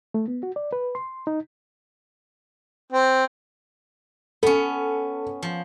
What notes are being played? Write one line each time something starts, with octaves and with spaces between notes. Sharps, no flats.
A3
B3
F#4
D5
B4
C6
D#4
C4
B3 C#4 A4
F3